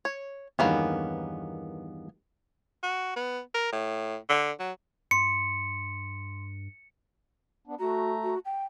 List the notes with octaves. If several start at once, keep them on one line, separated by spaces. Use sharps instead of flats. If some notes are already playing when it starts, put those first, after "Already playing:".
C#5
E2 G2 D#3 A#3 B3 C#4
F#4
B3
A#4
A2
D3
F#3
G2 C6 C#7
B3 D4
A3 F#4 A#5
F#4
G5